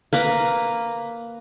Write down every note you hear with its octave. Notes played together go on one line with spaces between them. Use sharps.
A#3 B4 A#5